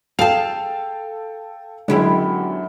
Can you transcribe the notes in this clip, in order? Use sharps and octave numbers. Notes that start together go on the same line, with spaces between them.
G#4 A4 F5 G5 A5 F7
F#2 B2 D3 G#3 E4 G4